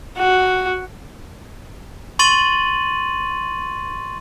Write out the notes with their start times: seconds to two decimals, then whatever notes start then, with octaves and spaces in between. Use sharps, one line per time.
0.18 F#4
2.19 C6 C#6 A6 D#7 F#7